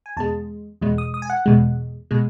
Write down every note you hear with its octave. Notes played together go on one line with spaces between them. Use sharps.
G#5
E2 B2 G#3 A5
E2 B2 G#3
D#6
D#6
G#5
F#5
E2 B2 G#3
B2 G#3